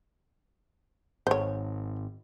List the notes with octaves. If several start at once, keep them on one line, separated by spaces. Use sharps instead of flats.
G#1 C5 C#5